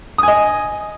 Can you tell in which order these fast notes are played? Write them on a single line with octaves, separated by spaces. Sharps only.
D#6 G#5 D#5